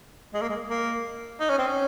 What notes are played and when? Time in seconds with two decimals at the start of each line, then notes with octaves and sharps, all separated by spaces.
0.34 G#3
0.42 A#3
0.50 G#3
0.70 A#3
1.40 D#4
1.50 C#4
1.58 C4
1.67 C#4